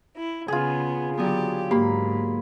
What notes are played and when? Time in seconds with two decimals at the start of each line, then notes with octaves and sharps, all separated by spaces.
0.16 E4
0.48 C#3 B3 F4 G#4
1.17 D3 F#3 B3 G4
1.71 G#2 A#3 G4 B5